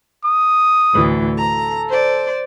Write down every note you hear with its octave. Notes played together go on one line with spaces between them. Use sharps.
D#6
D2 A2 E3
A4 A#5
C5 D5